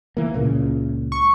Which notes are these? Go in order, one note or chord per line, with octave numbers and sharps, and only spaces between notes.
E3 A#3
C#2 A#2 C#3
C#6